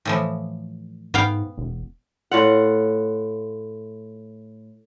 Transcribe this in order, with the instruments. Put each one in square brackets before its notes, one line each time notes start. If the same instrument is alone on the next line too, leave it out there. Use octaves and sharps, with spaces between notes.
[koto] A2 E3 F3
[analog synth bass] G#2 [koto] B3 F5 G5
[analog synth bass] E1
[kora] A2 F4 F#5